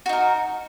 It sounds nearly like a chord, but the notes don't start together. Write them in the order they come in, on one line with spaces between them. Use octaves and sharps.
F#4 D#4 A#4